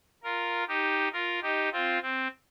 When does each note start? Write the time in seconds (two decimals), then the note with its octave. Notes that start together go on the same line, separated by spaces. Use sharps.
0.24 F4 A#4
0.68 D#4 G4
1.13 F4 A#4
1.43 D#4 G4
1.72 C4 F4
2.02 C4